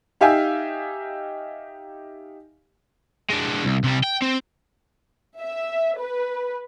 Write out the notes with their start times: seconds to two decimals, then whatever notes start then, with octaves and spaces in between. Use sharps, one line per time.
0.21 D#4 G4 E5 F5 G#5
3.30 G#3 D4
3.63 C2
3.84 C3 G3
4.04 G5
4.22 C4
5.41 E5
5.99 B4